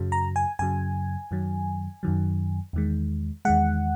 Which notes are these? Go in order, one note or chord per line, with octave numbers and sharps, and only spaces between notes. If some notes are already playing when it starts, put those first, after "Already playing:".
Already playing: F#2 C#3 F#3
A#5
G#5
F#2 C#3 F#3 G#5
F#2 D#3 F#3
F#2 D#3 F#3
E2 D#3 G#3
E2 D#3 G#3 F#5